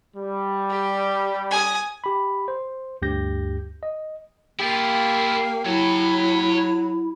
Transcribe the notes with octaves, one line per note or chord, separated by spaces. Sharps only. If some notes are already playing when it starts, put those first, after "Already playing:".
G3
G4
G#5 D#6
G4 B5
C5
D2 G2 G4 G6 A#6
D#5
A#3 E4 F4 G4
F#3 E4 C#5 A5